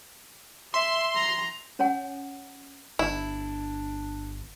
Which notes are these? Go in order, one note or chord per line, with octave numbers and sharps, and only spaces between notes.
E5 C6
A#5
C#4 C#5 F#5 G#5
G1 D4 E4